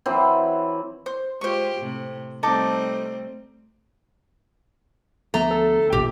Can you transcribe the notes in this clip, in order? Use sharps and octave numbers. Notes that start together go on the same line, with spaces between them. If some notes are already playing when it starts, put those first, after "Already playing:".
E3 F#3 C4
C5
G#3 F4 G4 C5 C#6
A2 C3
G3 A3 C4 D#4 A4 D6
D2 F3 A3 B3 A#5
A4
D2
A#1 E2 A2 C3 G4